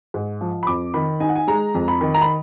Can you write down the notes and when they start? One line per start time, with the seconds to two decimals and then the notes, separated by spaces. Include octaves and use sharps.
0.14 G#2
0.41 F3
0.63 B5
0.67 F2 D6
0.94 D#3 B5
1.20 D#4 G#5
1.29 F#5
1.36 G#5
1.48 G#3 A#5
1.74 F2
1.88 B5
2.01 D#3
2.14 A#5
2.22 B5